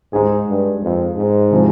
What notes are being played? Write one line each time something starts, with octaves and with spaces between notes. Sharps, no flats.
G#2 G#3 D#4 G#4
G2
F2
G#2
C3 F3 G#3